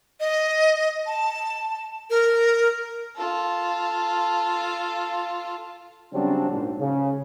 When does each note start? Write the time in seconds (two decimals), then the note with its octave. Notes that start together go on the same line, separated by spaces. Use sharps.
0.20 D#5
1.06 A5
2.10 A#4
3.16 F4 A4
6.13 C#3 F#3 G3 C4 D4 F#4
6.50 A#1 G#2
6.80 C#3